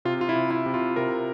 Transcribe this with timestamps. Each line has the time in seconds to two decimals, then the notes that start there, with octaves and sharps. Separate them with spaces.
0.05 C3 F4
0.21 F4
0.29 E4
0.36 C3
0.51 E4
0.66 C3
0.74 F4
0.96 C3 A#4